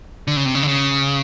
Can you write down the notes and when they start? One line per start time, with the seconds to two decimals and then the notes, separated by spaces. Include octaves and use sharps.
0.27 D3
0.37 C#3
0.46 C3
0.55 C#3
0.63 D3
0.68 C#3